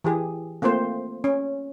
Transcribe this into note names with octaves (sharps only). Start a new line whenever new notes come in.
E3 G4 G#4
A3 A#3 C4 F4 C5
C#4